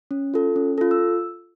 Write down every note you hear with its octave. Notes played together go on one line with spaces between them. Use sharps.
C#4
F4 A4
C#4
F4 A4
E6